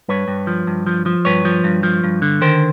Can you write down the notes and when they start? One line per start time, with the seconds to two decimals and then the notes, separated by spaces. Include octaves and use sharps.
0.09 G2 B4 C#5
0.28 G2
0.47 F3
0.67 G2
0.87 F3
1.06 F3
1.25 G2 B4 C#5
1.45 F3
1.64 G2
1.83 F3
2.04 G2
2.22 D3
2.41 D#3 A#4 C5